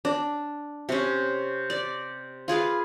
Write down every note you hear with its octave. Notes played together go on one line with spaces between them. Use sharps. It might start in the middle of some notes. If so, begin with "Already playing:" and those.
D4
C3 C#4
D5
F4 G#4 B4 F5